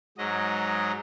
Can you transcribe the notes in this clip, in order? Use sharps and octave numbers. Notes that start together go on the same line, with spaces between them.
G#2 F#3 D#5